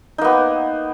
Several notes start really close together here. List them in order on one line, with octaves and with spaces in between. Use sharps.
D#4 A#3 B3